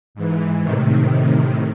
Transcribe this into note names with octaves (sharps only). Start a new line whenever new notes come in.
G#2 E3
A2 C3 D#3